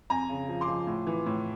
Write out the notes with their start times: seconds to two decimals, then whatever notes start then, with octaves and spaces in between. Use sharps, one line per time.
0.10 F2 G#5 A#5
0.29 C#3
0.49 F3
0.61 C6 D6
0.68 F3
0.87 A2
1.07 E3
1.26 A2